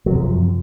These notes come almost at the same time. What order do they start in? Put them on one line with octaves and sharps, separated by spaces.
F#3 C3 F#2 F3